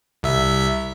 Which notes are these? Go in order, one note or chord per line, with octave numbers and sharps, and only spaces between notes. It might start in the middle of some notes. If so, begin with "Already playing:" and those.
C2 E5